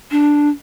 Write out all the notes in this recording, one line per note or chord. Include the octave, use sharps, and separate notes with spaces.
D4